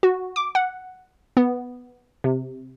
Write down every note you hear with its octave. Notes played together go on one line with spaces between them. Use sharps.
F#4
D6
F#5
B3
C3